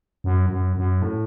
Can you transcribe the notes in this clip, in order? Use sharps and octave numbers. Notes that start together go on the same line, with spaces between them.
F#2
F#2
F#2
A2